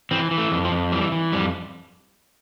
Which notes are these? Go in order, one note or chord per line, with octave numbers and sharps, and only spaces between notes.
E3 C4
E3
A3
F2
F3
F2
E3 G3
E3
F2 G3